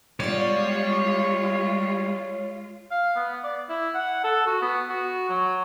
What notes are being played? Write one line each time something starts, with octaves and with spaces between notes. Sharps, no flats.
G3 G#3 B3 F4 C#5 D5
F5
B3
D5
E4
F#5
A4
F#4
B3
F#4
F#3